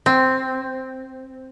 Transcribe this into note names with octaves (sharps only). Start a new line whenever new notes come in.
C4